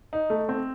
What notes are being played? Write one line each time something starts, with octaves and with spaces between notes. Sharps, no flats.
D#4
A3
C4